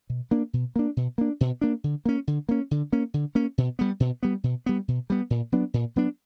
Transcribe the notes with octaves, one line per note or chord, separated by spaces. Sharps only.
B2
A#3 D4
B2
A#3 D4
B2
A#3 D4
B2
A#3 D4
D3
A#3 C#4
D3
A#3 C#4
D3
A#3 C#4
D3
A#3 C#4
B2
G3 B3
B2
G3 B3
B2
G3 B3
B2
G3 B3
A#2
F#3 B3 D4
A#2
F#3 B3 D4